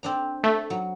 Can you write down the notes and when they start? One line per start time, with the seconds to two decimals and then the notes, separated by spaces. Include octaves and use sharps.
0.03 C4 D4 A#5
0.44 A3
0.70 F#3